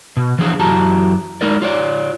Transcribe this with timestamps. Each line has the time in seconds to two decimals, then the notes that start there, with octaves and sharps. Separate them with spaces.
0.17 B2
0.39 E3 F3 D4 G#4
0.59 F#2 E3 F#4 G4 A5 A#5
1.41 G#3 D#4 A#4 D5
1.62 F4 C#5 D5